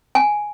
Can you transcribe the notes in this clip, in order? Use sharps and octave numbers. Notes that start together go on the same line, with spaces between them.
G#5